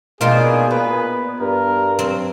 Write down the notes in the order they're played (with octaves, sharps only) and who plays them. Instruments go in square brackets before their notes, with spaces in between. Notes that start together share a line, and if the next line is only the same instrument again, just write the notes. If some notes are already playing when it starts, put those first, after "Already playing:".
[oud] B2 D4 D#4 [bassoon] A#3 [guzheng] F4 C5 G5 [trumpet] G#4
[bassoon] A#2 [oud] B3 [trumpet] B4
[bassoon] G2 [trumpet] A#4
[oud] F#3 [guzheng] C4